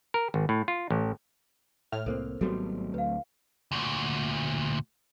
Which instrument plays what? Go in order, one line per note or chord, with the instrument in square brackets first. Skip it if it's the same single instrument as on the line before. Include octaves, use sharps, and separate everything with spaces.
[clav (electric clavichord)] A#4
G#1
A2
F4
A1
[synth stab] A2 F6
[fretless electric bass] C2 A#3 C4 [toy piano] A4 A#4 C5
[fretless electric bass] G#1 G3 B3 [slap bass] F#3 A3 C4 [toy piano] F#4 A4
[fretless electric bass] D2 [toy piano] B4 F5
[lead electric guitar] D2 A#2